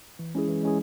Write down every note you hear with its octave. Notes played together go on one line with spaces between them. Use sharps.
E3
G#3 C#4 E4 G#4
E3
G#3 C#4 E4 G#4